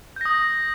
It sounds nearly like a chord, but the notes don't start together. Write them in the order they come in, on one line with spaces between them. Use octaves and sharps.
G6 A#6 D#6